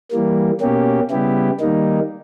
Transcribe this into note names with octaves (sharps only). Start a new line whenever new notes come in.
E3 G3 A#3
B2 A#3 C#4 G4
C#3 G3 B3 E4 G4
D#3 G3 A#3 D#4